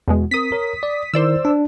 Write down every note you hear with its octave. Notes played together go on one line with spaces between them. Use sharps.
E2 B2 G#3
C4 A#4 D#6 B6
A#4 C#5
D5
D#3 E4 A#4 C5 D5 E6
D4